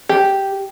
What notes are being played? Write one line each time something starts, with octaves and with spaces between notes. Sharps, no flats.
G4